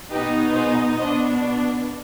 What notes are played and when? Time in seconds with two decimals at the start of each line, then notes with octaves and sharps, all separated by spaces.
0.11 B2 B3 D#4 G4 B4
0.55 G#4 C5
0.98 B2 B3 D4 C5 D#5